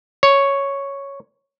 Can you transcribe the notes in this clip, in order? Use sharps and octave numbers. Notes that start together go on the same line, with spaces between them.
C#5